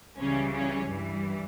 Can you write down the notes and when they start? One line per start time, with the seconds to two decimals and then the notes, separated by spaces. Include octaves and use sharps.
0.18 C#2 C#3 E3 G3 C#4
0.54 C#4
0.90 G2 E3 G3